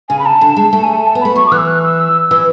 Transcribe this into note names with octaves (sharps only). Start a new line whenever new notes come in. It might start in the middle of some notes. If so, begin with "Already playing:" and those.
C#3 G#5
B5
A5
D3
G#3
A3 A5
G#5
A5
A5
B3
A3 B5
F#3 C#6
D6
E3 F#6
E6
F#6
E6
E3 E6